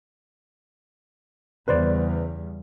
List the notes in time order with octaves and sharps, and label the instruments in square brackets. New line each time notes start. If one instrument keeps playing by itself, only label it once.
[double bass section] E2 C#3 G3 [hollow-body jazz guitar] B4 C5 D5